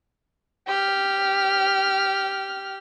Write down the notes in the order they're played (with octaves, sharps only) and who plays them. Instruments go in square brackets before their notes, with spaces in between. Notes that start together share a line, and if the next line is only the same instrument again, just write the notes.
[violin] G4 F6